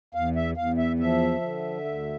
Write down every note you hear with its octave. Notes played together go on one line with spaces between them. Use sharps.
E2 F5
E5
E2 F5
E5
F3 E5
D3
D2